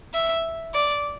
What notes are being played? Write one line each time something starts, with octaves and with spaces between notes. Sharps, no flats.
E5
D5